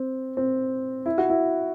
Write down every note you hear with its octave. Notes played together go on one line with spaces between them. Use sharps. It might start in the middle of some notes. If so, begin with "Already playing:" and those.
Already playing: C4
C4
E4
F#4
E4